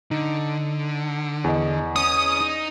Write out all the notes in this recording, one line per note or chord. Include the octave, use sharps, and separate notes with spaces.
D3 D#4
E2 D#5
C#4 D#6
D#4